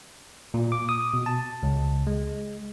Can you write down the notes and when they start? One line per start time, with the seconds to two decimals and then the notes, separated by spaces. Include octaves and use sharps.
0.54 A#2
0.72 D6
0.89 D#6
1.13 B2
1.26 A5
1.63 C#2
2.07 G#3